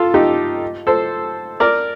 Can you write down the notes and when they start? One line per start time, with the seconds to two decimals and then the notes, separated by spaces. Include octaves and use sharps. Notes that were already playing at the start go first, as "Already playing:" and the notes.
Already playing: F4 A4
0.14 D#4 G4
0.87 A4 C5
1.60 A#4 D5